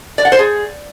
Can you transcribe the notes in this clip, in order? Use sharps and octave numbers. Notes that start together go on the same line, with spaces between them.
D5
F#5
C5
G#4